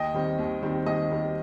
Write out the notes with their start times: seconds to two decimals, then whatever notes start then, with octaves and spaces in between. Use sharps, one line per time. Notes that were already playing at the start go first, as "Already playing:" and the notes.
Already playing: D#2 D#5 G5
0.14 D#3 G3 C4
0.39 D#2
0.63 D#3 G3 C4
0.86 D#2 D#5
1.10 D#3 G3 C4